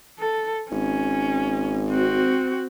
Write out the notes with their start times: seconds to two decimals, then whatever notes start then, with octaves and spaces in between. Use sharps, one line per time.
0.19 A4
0.71 G#1 C#4
1.89 C4 F#4